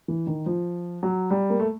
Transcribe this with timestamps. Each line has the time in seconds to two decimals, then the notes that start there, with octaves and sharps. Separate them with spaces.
0.08 E3
0.27 D#3
0.46 F3
1.03 F#3
1.30 G3
1.50 A#3
1.59 A3